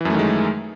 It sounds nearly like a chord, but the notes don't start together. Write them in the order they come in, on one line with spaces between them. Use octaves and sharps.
E3 F#2 A3 D#3 G#3